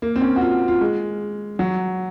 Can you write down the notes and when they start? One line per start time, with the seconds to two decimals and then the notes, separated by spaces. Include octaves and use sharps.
0.02 A#3
0.16 C4
0.21 C#4
0.36 F#4
0.41 F4
0.68 F4
0.81 G#3
1.59 F#3